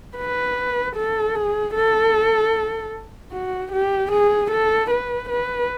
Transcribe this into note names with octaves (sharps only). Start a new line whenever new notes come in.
B4
A4
G#4
A4
F#4
G4
G#4
A4
B4
B4